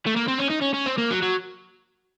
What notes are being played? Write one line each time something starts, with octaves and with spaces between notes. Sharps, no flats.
A3
A#3
C4
C#4
D#4
C#4
C#4
C4
A#3
F#3
F#3